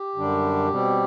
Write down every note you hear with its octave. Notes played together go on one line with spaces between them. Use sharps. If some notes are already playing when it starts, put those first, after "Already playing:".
Already playing: G4
F#2 D3 G3 D4
B2 G3 C4